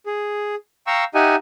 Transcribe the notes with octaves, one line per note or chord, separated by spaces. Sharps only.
G#4
F5 G5 A#5 C#6 E6
D#4 G4 D#5 E5 F#5 G#5